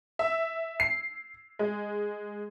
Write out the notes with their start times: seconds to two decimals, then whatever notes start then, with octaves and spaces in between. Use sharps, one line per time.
0.19 E5
0.80 C7
1.59 G#3